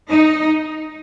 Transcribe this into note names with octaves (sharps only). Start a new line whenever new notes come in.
D#4